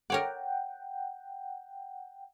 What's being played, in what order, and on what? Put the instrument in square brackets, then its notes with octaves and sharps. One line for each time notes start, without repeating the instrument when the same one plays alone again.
[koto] A#4 C#5 D5 [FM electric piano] F#5 G5